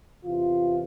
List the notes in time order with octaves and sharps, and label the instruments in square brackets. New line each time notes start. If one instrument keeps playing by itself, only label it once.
[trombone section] E2 C3 E3 F4